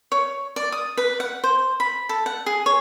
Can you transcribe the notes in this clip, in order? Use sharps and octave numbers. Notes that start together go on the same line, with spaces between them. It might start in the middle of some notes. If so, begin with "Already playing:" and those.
C#5
D5
D#6
B4
F#5
C5
B5
A4
F#5
G#4
C#5